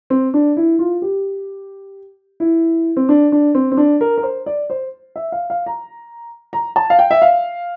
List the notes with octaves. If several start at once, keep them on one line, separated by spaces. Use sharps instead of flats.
C4
D4
E4
F4
G4
E4
C4
D4
D4
C4
C4
D4
A#4
A#4
C5
D5
C5
E5
F5
F5
A#5
A#5
A5
F5
G5
E5
F5